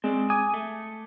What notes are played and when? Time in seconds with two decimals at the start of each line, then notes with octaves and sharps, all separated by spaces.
0.04 G#3 C4 D5
0.30 G#5 D6 D#6 G#6
0.54 A3